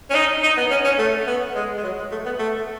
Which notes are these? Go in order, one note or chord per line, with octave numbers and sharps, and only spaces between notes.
C#4
D#4
D#4
B3
C#4
C#4
A3
B3
G#3
G#3
F#3
G#3
A3
B3
A3